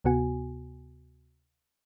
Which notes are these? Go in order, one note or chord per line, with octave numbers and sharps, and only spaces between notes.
D2 C3 B3 F#4 G#5